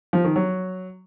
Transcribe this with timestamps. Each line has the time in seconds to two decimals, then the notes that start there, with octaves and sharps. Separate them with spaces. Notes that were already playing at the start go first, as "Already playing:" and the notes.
0.13 F3
0.24 D#3
0.36 F#3